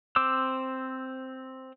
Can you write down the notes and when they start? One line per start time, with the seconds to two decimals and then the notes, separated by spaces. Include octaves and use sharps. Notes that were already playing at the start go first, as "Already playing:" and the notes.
0.16 C4 C5 D6 E6